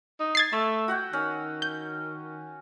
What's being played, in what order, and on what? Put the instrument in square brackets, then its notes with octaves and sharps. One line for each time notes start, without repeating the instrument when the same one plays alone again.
[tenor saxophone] D#4
[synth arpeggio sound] G#6 A6 C7
[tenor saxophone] A3 [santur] E6
[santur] F#4 F#5 G5
[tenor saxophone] D#3 [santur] C#4
[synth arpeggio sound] G6